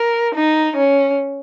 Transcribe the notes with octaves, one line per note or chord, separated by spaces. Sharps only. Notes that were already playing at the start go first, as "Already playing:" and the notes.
Already playing: A#4
D#4
C#4